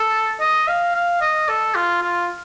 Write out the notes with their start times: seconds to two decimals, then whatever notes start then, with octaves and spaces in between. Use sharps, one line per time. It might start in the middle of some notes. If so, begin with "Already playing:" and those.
Already playing: A4
0.40 D#5
0.68 F5
0.95 F5
1.21 D#5
1.48 A4
1.75 F4
2.02 F4